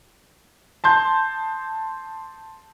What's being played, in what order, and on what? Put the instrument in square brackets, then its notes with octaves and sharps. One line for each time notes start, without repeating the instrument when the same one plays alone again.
[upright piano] A5 C6 G6